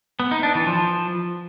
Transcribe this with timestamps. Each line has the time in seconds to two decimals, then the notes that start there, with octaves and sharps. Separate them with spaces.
0.20 B3
0.31 D#4
0.43 D4
0.55 E3
0.67 F3